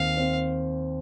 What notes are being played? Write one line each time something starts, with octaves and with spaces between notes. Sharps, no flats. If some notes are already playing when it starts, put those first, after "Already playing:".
Already playing: D#2 C4 F5
C4